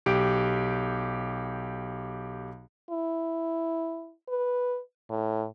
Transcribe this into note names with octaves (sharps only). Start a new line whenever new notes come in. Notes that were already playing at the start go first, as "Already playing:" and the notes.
B1 G4 D7
E4
B4
A2